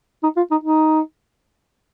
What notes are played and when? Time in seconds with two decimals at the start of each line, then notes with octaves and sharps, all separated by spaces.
0.23 D#4
0.37 F4
0.51 D#4
0.64 D#4